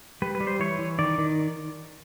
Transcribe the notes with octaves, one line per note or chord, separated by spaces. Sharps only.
G3 B4
B4
G3
C5
E3 C#5
E3
D#3 D5
D#3